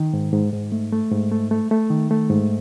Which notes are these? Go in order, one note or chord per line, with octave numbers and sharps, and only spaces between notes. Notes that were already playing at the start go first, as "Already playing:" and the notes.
Already playing: D#3
G#2
G#2
G#2
A3
A3
G#2
A3
A3
A3
D#3
A3
G#2